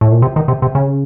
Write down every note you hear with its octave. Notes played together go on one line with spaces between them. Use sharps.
A2
A#2
C3
D#3
C3
C3
C#3